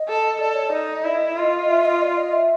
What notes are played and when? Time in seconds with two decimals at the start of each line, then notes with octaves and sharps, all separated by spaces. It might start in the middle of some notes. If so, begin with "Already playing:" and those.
Already playing: D#5
0.09 A4
0.40 A4 D5
0.54 C#5
0.66 D5
0.73 D#4
1.05 E4 D#5
1.37 F4
1.68 E5
1.85 D#5
2.01 D5
2.17 D#5
2.32 E5